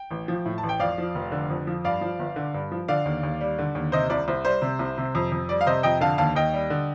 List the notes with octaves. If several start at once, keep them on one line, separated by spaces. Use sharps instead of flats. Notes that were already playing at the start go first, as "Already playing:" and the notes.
Already playing: G5
A1
F3
A2
A5
A1
G5
F2 D5 F5
F3
F1
D3
F2
F3
G2 D5 F5
F3
G1
D3
G2
F3
D3 D5 F5
D#2
D#2
G3
D3
D#2
C3 C5 D#5
C2 D5
C2 C5
G3 C5
C3
C2
C3
F2
F2
G3 D5
F5
C3 C5 D#5
F2 D#5 G5
D3 F5 A5
D#2 F5 A5
D#2 D#5 G5
G3
D3